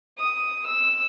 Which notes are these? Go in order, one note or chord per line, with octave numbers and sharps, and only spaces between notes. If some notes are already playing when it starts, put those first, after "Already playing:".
D#6
E6